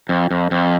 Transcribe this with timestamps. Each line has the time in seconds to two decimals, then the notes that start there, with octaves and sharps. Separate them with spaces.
0.09 F2
0.31 F2
0.51 F2